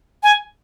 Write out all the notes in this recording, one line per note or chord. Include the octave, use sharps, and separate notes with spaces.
G#5